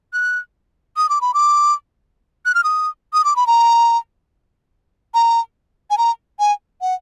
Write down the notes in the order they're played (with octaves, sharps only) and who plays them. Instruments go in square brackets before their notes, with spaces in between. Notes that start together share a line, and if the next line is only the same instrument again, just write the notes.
[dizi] F#6
D#6
D6
B5
D6
F#6
F6
D#6
D#6
D6
B5
A#5
A#5
G#5
A#5
G#5
F#5